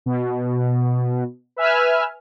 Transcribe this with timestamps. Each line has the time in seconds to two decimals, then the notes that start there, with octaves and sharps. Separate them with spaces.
0.06 B2
1.56 B4 E5 G#5 F6